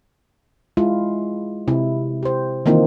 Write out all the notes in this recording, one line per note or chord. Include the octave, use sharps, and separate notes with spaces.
G#3 E4 F4
C3 E4
G4 C5
D#3 E3 A#3 C4 D#4 F4